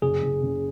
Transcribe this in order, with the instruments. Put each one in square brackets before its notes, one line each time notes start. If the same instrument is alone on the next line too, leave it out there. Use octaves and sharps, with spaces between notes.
[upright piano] F#1 [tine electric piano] G#4
[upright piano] F#1
C#3